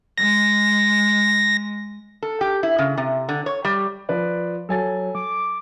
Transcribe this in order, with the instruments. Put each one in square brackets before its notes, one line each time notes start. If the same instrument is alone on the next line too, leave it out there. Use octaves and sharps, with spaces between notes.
[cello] G#3 [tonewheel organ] A#6
[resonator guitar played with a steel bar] A4
G4
E4
C#3
C3
D3
C#5
G3
[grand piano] F3 B4 D5
[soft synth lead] F#3 [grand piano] A4 G#5 A6
[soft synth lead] D6